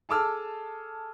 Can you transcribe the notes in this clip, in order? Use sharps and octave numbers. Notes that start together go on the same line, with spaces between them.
G#4 A4 A5 D6 E6 F6